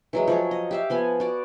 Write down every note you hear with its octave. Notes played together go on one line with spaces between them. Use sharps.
E3 F#3 G#3
F3 F#3 C#5
D#5
G4 E5 F5
F3 B3 G#5
F#4 D5